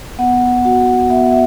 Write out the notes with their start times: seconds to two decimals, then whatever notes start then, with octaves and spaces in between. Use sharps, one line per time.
0.19 B3 F#5
0.64 F#4 F#5
1.10 B3 E5
1.31 E5